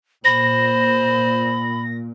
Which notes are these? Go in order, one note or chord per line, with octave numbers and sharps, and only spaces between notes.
A#2 C5 B5 A#6